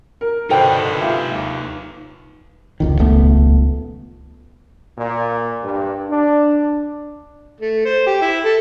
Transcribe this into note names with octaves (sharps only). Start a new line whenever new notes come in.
A#4
G2 B2 D3 D#4 A4 B4 C5 G5
G#3 F4 G4 E5
D#2
F1 C#2 D#3
D#1 C#2 A3 B3
A#2
G2
D4
A3
C5
G4
E4
A4